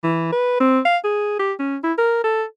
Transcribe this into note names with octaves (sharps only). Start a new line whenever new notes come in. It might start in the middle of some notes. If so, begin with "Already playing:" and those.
E3
B4
C4
F5
G#4
G4
C#4
E4
A#4
A4